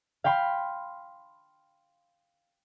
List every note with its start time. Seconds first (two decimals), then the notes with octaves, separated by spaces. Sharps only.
0.24 F5 G5 B5 C6